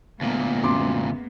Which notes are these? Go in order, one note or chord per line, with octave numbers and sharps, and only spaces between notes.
D2 A#2 G#3 A#3 B3
F#2 C6 D6